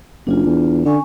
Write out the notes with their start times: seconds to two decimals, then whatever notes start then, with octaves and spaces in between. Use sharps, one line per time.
0.27 F#1 D4 F4
0.46 E2
0.85 D3 C#4 G#5 C#6